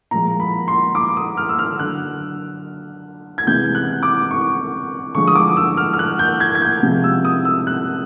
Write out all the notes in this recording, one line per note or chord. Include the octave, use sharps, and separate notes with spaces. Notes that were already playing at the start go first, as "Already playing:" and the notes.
A#2 F3 G#3 A#5
B5
C6
D6
D#6
F6
E6
F6
D3 F#3 F#6
G#6
C3 E3 G#3 G6
F#6
D6
C#6
D3 F3 G#3 C#6
D#6
D6
E6
F6
F6
F#6
G6
G#6
G#6
G6
C3 F3 G#3
E6
D#6
E6
F#6